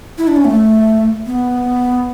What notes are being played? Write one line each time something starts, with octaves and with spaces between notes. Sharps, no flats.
E4
D4
C#4
A3
B3